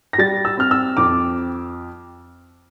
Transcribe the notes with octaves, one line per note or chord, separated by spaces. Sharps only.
A#6
G3 A6
E6
C4 F6
E6
F2 D6